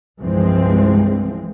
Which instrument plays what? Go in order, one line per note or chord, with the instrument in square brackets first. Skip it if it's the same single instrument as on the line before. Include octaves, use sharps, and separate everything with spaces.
[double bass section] C2 G2 E3 F3 G#3 C4